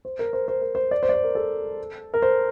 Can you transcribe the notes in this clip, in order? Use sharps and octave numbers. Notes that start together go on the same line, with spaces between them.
C5
A#4
C5
C5
A#4
C5
D5
C5
D5
C5
A#4
A4
A#4
C5